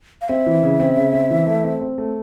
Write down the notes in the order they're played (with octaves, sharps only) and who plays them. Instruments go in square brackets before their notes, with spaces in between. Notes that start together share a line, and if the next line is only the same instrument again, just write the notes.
[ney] F5
[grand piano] C4 [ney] E5
[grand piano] E3
C#3
C4
C#3
C4
E3
A3
C4
C4
A3